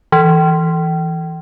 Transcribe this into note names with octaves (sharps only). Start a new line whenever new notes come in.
E3